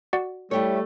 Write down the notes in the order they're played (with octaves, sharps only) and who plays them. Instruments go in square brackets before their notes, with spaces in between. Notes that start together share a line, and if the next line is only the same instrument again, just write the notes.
[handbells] F#4 D5 F#5
[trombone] G3 [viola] A3 [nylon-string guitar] E4 G4 C#5